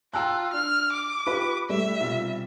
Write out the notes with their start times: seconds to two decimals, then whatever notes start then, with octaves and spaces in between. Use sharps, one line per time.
0.14 F4 G5 A5 A#5 E6 F#6
0.53 D4 F6
0.92 D6
1.27 F4 G4 B4
1.69 G3 A3 E5
2.00 B1 C3 F4